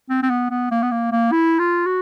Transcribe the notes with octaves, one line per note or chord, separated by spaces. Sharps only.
C4
C4
B3
B3
A#3
B3
A#3
A#3
E4
F4
F#4